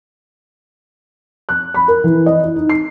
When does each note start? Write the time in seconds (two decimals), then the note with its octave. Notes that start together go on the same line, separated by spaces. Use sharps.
1.49 F#6
1.74 B5
1.88 A#4
2.04 E3
2.26 D#5
2.44 E4
2.56 D#4
2.69 C7